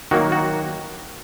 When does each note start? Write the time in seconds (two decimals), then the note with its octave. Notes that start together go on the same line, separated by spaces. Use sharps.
0.11 D#3 F#3 A#3 F#4
0.32 F#4